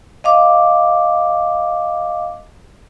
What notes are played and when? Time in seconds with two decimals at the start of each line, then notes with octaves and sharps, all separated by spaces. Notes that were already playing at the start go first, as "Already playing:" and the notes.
0.24 D#5 F5 D6